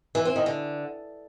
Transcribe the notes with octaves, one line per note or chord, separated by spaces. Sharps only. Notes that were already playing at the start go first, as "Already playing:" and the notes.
E3
C4
D#3
D3